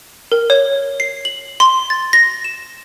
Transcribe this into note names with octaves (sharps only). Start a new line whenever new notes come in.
A#4
C#5
C7
F#7
C6
A6
A#6
E7